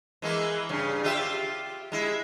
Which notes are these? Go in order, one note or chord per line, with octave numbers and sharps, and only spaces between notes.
E3 G#3 A#3
G2 C#3
F4 G4 E5
G#3 E4